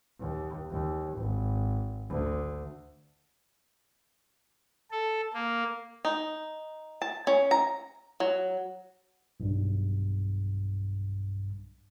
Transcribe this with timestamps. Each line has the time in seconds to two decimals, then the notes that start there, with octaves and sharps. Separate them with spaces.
0.20 D#2
0.71 D#2
1.18 G#1
2.09 D2
4.91 A4
5.34 A#3
6.05 D#4
7.02 A5
7.27 C#4
7.51 A#5
8.20 F#3
9.40 B1 G2